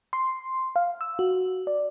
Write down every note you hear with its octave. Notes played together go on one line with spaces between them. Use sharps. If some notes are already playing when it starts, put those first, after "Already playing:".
C6
F5
E6
F#4
D5